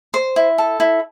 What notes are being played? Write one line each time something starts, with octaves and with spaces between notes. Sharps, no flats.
C5
E4
A4
E4